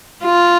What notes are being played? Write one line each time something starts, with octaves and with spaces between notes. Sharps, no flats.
F4